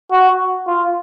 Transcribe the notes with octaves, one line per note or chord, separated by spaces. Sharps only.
F#4
F4